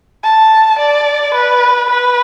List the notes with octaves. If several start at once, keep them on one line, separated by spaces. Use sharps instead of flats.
A5
D5
B4
B4